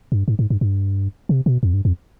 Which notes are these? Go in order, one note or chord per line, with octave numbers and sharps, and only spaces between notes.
G2
G#2
G#2
G2
G2
C3
B2
F2
G2
F2